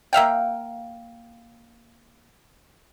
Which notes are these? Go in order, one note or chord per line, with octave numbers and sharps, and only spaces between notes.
A#3 E5 F5 G5